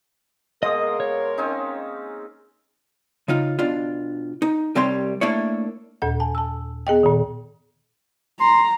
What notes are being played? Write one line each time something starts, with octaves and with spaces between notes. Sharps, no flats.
B2 G#3 A#3 A#4 D#5 D#6
C#5
C4 C#4 D#4
C#3 D#4 F4
B2 D4 F4
D#4
C2 G3 C4 G4 C#5 C6
A3 A#3 D4 E4 C#5
D#2 A#2 A4 F#5
G#5 A5
A5 E6
B3 G#4 D#5 G5
A#2 D#3
A#5 C6